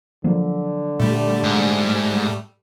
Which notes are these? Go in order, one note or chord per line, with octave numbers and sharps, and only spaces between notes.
D3 F3 F#3 A#3
A#2 G3 A3
G#2